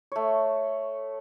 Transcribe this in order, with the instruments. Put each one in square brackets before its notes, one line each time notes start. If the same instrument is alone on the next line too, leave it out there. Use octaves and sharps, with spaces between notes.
[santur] A3 C#5